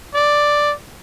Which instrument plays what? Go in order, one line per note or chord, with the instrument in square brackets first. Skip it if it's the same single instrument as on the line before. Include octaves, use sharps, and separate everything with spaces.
[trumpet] D5